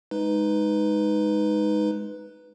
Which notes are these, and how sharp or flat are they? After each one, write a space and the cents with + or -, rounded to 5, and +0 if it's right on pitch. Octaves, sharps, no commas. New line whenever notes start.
G#3 +0 D#4 +0 B4 +0